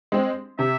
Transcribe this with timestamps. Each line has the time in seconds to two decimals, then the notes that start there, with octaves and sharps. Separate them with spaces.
0.12 G#3 C4
0.59 C3 E5